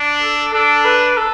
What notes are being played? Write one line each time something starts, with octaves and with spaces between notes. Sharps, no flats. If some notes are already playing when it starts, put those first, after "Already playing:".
Already playing: D4
A4
D4 A4
B4
A4